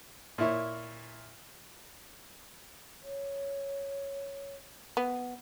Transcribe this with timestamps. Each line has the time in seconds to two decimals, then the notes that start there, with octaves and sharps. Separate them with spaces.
0.38 A#2 E4 C#5
3.03 C#5
4.97 B3